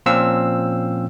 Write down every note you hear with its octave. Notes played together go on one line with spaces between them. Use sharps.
A#2 F3 C4 C#4 F5 E6